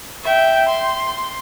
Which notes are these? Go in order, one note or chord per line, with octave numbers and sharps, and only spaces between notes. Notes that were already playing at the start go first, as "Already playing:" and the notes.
E5 G5
C6